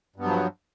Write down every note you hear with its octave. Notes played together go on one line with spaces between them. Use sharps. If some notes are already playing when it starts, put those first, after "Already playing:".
G2 F3 F#3 B3